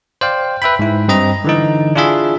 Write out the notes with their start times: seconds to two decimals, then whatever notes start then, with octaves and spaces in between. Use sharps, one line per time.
0.21 C5 D5 F5 G5
0.62 B4 E5 G5 B5
0.79 G#2 E4
1.08 G2 C4 D#5 A#5
1.44 D3 E3 D#4
1.95 D4 E4 F4 G#4 E5